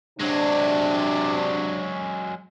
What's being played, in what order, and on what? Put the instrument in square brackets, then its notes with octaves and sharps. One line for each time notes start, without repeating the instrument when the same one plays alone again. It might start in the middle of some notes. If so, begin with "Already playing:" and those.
[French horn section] C3 D4 [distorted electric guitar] F#3 G#3